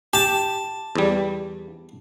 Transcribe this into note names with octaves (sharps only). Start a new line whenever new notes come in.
G4 A5
E2 G3